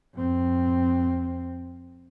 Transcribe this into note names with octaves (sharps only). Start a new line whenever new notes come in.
F2 C4